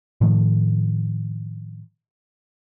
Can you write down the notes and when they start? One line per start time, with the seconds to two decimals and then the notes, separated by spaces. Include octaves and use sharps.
0.21 A2 D#3 F3